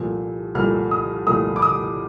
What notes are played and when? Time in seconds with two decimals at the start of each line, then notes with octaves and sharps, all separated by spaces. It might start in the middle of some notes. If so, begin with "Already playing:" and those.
Already playing: C2 A#2 F3 A3
0.55 C2 A#2 F3 A3 F6
0.91 D#6
1.26 C2 A#2 F3 A3 D#6
1.56 D6
1.62 D#6